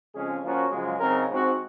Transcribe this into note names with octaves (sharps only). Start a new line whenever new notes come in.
F2 C#3 G#3 C#4 G#4
F3 A#3 C#4 F#4
F#2 C#3 F3 G#3
C#3 F#3 C4 D#4 A#4
G#2 F3 C4 F#4